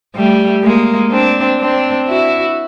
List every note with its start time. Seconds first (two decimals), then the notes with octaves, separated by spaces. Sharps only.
0.15 G3 A3
0.63 G#3 A#3
1.11 C4 D4
1.60 C4 D4
2.08 E4 F#4